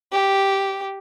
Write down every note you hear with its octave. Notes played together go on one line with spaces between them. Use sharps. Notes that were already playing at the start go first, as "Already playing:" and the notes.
G4